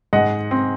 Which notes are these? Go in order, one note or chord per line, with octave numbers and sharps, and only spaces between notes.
G#2 D#5 F#5
C4